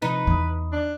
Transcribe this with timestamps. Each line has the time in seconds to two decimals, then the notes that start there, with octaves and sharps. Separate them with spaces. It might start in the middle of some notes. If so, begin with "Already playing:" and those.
0.02 C3 F3 D#4 B4
0.27 E2 E3 B5 D#6
0.72 D4